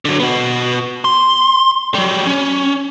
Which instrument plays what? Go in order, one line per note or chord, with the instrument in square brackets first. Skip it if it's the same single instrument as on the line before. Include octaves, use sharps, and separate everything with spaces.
[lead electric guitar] D3 F#3
B3 F#4
C6
F#3 G3
C#4